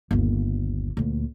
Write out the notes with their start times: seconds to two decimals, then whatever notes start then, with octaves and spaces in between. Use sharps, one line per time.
0.11 G1 D#2
0.97 D2 A#2